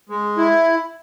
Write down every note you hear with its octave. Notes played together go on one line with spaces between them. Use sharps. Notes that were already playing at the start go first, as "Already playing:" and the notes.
G#3
E4